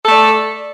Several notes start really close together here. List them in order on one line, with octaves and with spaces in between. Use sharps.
A4 A3 D5